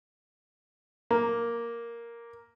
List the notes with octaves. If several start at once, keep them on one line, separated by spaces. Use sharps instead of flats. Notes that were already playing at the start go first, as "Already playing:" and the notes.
A#3